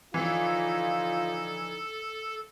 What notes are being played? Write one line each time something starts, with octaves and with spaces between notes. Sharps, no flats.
D3 E3 F3 D#4 F4 A4